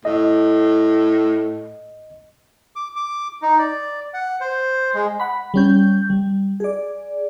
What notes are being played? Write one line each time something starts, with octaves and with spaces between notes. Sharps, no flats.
A2 D#5
D6
D6
D#4
D5
F#5
C5
G#3
F#5 B5
G3 C#4 G6
G3
G#4 D5